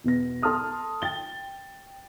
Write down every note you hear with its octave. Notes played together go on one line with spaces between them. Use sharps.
E2 B2 B3 A#6
A4 A5 C6 D#6 F6
G5 A6 G7